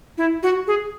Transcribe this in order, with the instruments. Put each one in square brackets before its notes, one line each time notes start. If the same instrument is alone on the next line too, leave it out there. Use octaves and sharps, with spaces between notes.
[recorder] E4
F#4
G#4